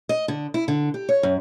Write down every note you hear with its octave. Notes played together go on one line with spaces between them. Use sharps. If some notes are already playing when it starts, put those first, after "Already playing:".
D#5
D3
E4
D3
G4
C#5
F#2